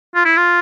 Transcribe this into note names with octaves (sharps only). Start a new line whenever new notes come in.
F4
E4
F4